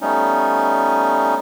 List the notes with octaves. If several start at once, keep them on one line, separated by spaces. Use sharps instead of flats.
G3 A3 B3 C#4 D#4